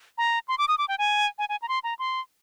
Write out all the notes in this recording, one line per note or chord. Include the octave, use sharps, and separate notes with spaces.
A#5
C6
D6
D#6
D6
G5
G#5
G#5
G#5
A#5
C6
A#5
C6